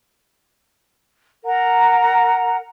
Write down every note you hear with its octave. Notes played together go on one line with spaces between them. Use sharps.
A#4 F#5 A#5